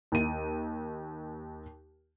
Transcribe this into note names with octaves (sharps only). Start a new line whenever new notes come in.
D#2 D#7